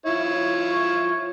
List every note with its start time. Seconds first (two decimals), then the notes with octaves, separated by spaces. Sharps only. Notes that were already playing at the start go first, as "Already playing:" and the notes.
0.06 F3 E4 F4 C#5